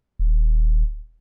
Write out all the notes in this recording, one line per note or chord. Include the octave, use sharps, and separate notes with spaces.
D#1